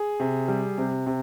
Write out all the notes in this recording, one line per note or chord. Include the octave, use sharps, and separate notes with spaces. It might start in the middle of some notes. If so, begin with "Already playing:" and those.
Already playing: G#4
C3
G3
C3
C3